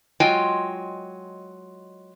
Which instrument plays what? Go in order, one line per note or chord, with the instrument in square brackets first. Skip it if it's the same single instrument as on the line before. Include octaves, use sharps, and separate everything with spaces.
[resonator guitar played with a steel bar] F#3 G#3 F4 D#5 G5 G#5